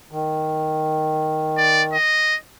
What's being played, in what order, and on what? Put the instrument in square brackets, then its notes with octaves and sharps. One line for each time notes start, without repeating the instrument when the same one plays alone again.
[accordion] D#3
[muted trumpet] D5
D#5